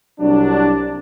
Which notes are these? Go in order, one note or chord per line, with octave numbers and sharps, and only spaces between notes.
C2 F#3 D4